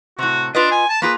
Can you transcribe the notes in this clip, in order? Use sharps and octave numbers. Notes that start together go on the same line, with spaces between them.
A2 C3 F#4
D4 F4 B4 D#5
G#5
A5
A#3 F4 G#4 B4